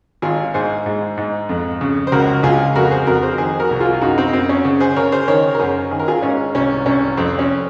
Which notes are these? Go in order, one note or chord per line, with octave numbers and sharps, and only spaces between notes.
G#1 F4 G#4
G#2 G#4 C5
G#2
G#2
F2
C#3
C5
C#2 F#4 A#4
C#2 F4 G#4
F2 F#4 A#4
G#4 C5
F2 F#4 A#4
G#4 C5
D#3 G#4 C5
F#4 A#4
C2
F4 G#4
G#4
F#2 D#4 F#4
C4 D#4
F#2 C4
C#4
C#3
G#4 C5
C#3 A#4 C#5
G#4 C5
D#3 A#4 C#5
A#4
F#2 G#4 C5
D#3 G#4
A#4
F4 G#4
G#2 C#4
C2 C#4
C2 C#4
F2 C4
C#4